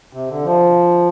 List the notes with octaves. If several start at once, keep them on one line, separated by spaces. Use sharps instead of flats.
C3
D3
F3